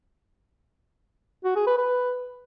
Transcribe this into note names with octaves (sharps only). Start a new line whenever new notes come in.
F#4
G#4
B4
B4